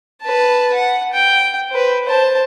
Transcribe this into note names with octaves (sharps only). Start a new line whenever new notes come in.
B4 A5
F#5
G5
B4 C5
C5 A5